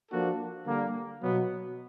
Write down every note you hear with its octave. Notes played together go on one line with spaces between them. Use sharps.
F3 A#3 D4 F#4 A4
D3 G3 A#3
B2 F#3 B3